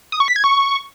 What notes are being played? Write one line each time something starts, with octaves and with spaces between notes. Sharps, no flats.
D#6
C#6
B6
G#6
C#6